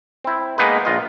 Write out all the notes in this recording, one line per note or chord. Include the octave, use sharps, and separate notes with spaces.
C4 E4
G#3 A#3 B3 D#4 B4
A#1 F4 D#5